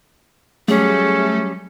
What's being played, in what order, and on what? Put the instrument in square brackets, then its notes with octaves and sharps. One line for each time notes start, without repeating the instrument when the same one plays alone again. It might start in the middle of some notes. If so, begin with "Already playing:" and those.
[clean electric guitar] F#3 G3 [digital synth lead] A3 [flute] C#4 [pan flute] G#4